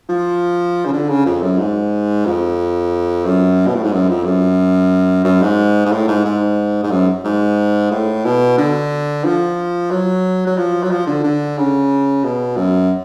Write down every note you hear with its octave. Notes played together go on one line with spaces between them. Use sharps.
F3
C#3
D3
C#3
F2
F#2
G#2
F2
F#2
B2
A2
G#2
F#2
F2
F#2
F#2
G#2
G#2
A2
G#2
G#2
G#2
F#2
G#2
A2
B2
D3
F3
F#3
F#3
F3
F#3
F3
D3
D3
C#3
B2
F#2